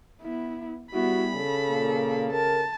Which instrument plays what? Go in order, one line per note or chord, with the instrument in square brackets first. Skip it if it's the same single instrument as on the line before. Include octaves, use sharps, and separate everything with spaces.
[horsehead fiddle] B3 E4
[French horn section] G3 [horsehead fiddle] B3 E4 [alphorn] F#4 [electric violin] B5
[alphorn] C#3 [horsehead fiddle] A4
[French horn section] A#2 A#3
[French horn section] A#4 [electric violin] A5